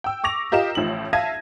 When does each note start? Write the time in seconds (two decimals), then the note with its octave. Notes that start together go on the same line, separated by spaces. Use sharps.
0.04 G5 E6
0.24 C#6 D6 A#6 F7
0.52 F4 G4 A#4 D#5 F5 E7
0.75 A1 A2 F3 F#7
1.13 E5 F5 A5 G#6 A#6 D#7